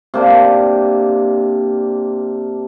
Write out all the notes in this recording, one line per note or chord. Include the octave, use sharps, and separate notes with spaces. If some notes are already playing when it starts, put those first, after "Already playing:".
C3 A#3 D4